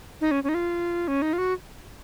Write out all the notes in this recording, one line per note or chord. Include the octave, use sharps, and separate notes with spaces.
D#4
C#4
C#4
D#4
F4
C#4
D#4
F4
F#4